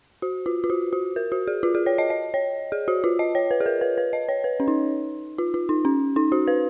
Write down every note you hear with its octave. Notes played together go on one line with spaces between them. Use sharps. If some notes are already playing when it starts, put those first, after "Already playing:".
F#4
F4
F4
F#4
F#4
A#4
F#4
G#4
F4
G#4
C#5
D#5
D#5
C#5
G#4
F#4
F4
D#5
C#5
B4
G#4
A#4
B4
B4
D#5
C#5
B4
C#4
D#4
F4
F4
D#4
C#4
D#4
F#4
B4